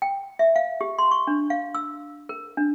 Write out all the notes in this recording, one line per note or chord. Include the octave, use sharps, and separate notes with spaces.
G5
E5
F5
G4
C6
C#6
D4
F5
E6
A#4
D4